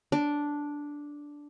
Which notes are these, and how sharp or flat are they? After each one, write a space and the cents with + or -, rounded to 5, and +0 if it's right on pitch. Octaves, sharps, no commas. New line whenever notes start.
D4 -5